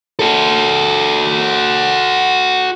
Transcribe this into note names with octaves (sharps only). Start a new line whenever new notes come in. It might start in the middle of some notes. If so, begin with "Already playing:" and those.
F#4 A4